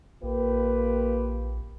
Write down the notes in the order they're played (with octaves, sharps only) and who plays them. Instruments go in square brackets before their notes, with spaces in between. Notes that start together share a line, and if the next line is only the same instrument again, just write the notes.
[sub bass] A#1 [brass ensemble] A#3 F4 G4 [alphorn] B4